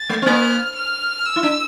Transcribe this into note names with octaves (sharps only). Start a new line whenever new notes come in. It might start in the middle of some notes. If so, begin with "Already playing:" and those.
Already playing: A6
A3
C4
A#3 F6
F6
E6
E4
D4